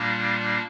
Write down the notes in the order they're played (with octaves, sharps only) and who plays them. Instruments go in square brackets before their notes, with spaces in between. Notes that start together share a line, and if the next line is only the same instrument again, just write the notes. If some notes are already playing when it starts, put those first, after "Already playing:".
Already playing: [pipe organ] A#2 G3 A#3 D4